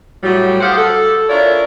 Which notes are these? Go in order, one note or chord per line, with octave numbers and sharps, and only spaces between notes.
A2 F#3 G3
G4 G#4 C5 F5 F#5
A4
D4 E4 F4 A#4 C#5 D5